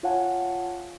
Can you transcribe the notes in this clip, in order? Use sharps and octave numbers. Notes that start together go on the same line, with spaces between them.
F4 C#5 F5 F#5 G#5 A5